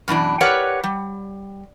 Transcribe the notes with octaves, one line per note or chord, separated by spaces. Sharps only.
F#2 B2 E3 D4
G4 A#4 B4 C#5 D5 F#5
G3